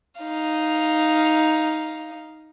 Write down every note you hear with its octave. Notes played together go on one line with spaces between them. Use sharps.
D#4 F5